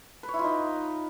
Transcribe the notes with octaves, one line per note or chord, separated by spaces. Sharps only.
B4
C#5
E4
F4
D#4